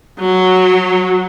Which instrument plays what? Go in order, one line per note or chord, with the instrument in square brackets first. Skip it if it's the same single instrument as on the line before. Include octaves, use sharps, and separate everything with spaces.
[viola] F#3